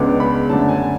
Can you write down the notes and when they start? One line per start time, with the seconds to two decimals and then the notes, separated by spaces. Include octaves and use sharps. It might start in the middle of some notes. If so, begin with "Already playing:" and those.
Already playing: C#2 C#3 G#3 B3 D4 D6
0.20 B5
0.49 F#2 D3 A3 D4 A5
0.68 G#5